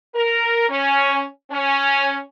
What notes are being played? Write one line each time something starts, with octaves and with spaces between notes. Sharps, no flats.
A#4
C#4
C#4